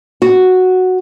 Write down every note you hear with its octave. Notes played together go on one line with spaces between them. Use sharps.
F#4